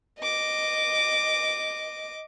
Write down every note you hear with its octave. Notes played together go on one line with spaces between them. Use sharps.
D#5 D6